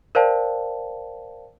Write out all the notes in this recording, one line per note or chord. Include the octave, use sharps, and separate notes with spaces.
A#4 C5 D5 F5 G5 A5